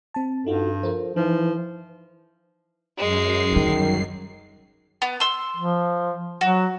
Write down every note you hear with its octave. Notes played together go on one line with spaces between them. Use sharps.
C4 A5
G2 D#4 F4 F#4 A4
F3 A4 A#4 C5
E3 F3 D#4
F#2 G#3 C7
D3 D#3 G3
B3
C6 E6
F3
F#3 F#4